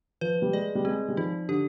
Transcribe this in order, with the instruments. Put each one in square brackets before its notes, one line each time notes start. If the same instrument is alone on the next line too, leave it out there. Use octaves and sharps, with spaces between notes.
[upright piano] F3 [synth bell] B4
[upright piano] G3
[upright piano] G#3 [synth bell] D5
[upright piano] G3
[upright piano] G#3 [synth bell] C4
[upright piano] G3
[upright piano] F3 [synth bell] D#4
[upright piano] D3 [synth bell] G4